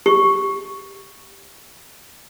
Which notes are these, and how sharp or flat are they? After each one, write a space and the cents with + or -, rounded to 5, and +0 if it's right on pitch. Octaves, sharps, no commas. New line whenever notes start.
G4 +0 C#6 +0